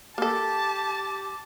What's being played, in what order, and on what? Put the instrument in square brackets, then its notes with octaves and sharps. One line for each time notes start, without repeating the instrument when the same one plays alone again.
[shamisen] A#3 A4 [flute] G4 [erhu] A5 [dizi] D6